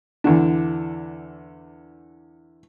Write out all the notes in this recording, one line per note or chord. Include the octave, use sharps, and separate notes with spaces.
E2 D3 D4